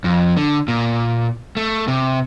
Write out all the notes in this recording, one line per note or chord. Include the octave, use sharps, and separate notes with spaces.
F2
D3
A#2
A3
C3